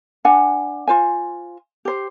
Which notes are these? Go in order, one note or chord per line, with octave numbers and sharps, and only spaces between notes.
D4 F#5 G#5
F4 C5 G#5
G4 C5